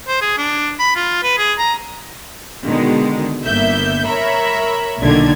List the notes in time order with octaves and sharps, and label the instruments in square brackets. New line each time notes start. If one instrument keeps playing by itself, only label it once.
[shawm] C5
G#4
D4
B5
F4
B4
G#4
A#5
[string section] B2 D3 D#3 G#3
G1 A#3 B3 E5 G6
A#4 C#5 E5 A#5 B5
B1 A#2 D3 D#3 D4 G#6